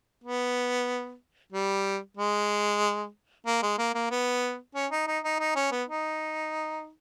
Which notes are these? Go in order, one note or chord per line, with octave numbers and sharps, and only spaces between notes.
B3
G3
G#3
A#3
G#3
A#3
A#3
B3
C#4
D#4
D#4
D#4
D#4
C#4
B3
D#4